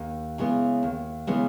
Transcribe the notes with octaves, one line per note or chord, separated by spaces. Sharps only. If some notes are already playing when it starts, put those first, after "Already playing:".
Already playing: D#2
C#3 E3 G#3 B3
D#2
C#3 E3 G#3 B3